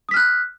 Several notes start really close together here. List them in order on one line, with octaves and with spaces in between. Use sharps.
D#6 B6 F6 F#6